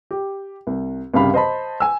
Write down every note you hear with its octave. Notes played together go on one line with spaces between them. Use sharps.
G4
C2
C2 G2 C#3 G4 F5 B5
C5 D#5 A5 B5
G#5 E6